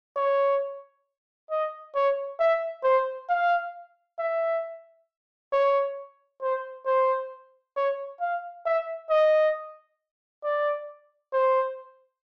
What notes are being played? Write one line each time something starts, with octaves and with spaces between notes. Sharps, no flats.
C#5
D#5
C#5
E5
C5
F5
E5
C#5
C5
C5
C#5
F5
E5
D#5
D5
C5